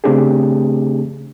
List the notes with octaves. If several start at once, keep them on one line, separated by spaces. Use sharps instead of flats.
C#3 A3 C4 D4 G4 G#4